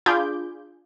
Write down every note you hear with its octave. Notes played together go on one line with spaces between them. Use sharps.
D4 F4 G#4 B5 D6 G6